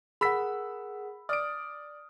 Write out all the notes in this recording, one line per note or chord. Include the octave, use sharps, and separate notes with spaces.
G#4 A#4 F#5 B5 E6 B6
D5 D#6 F6 D7